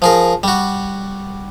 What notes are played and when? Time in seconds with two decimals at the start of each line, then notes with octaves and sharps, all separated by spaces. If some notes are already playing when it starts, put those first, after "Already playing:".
0.02 F3 G#4 A#4
0.43 G3 F#4